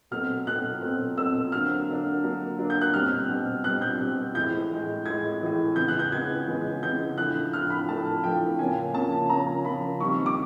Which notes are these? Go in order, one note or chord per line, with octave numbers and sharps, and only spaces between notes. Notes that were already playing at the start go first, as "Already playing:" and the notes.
B2 F#3 A3 C4 F6
B2 F#3 A3 C4 F#6
B2 F#3 A3 C4
B2 F#3 A3 C4 E6
D3 F#3 A#3 D4 F6
D3 F#3 A#3 D4
D3 F#3 A#3 D4
D3 F#3 A#3 D4
G6
F#6
B2 G3 C4 F6
B2 G3 C4
B2 G3 C4 F#6
G6
B2 G3 C4
A2 E3 G#3 G6
A2 E3 G#3
A2 E3 G#3 G#6
A2 E3 G#3
C#3 E3 G#3 B3 G6
F#6
G6
C#3 E3 G#3 B3 G#6
C#3 E3 G#3 B3
C#3 E3 G#3 B3 G6
A2 F3 A3 D4 F#6
A2 F3 A3 D4 F6
B5
A2 F3 A3 D4 A5
A2 F3 A3 D4 G5
C#3 F3 A#3 C#4 G#5
C#3 F3 A#3 C#4 A5
C#3 F3 A#3 C#4 A#5
C#3 F3 A#3 C#4 B5
D#3 G3 C4 C#6
D6